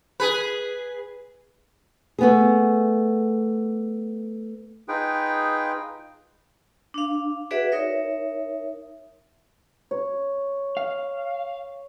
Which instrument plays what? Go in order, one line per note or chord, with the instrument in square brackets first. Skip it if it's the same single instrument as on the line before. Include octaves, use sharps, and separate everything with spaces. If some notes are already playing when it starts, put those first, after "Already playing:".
[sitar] G#4 B4
[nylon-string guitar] A3 B3 G#4
[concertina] D#4 F4 G#4 B4 G5
[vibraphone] D4 F5
F#4 G#4 B4 D5 E5 F#5
D#4 A#4 C#5 E5
[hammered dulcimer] C#5
[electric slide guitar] F5